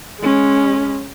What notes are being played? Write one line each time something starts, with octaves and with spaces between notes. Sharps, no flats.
G#3 C#4